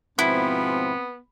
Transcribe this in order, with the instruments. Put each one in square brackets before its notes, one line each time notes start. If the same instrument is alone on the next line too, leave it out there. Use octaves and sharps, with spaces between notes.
[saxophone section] G#2 B2 F3 [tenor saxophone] B3 [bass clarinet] C4 [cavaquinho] E4